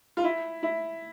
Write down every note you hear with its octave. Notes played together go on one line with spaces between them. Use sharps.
F4
E4
E4